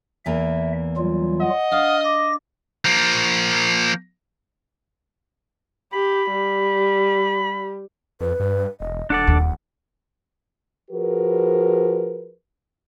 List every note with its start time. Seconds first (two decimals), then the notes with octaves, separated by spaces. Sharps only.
0.26 E2 E3 A#3 E5
0.97 F#3 G3 F4
1.41 D#5 F#5
1.71 D4 F5 D#6 F6
2.04 D6 A#6
2.85 F3 A#3
5.93 G4 B5
6.31 G3
8.21 F2 B4
8.40 G2
8.80 E1 D#5
9.10 D#1 D4 A4 D5 F#5
9.27 D#2
10.91 F3 F#4 G#4 A#4 B4